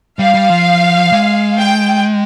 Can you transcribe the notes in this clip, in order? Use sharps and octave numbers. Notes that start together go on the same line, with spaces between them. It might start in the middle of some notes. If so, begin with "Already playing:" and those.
G3 F5
G3
F3
G#3
G5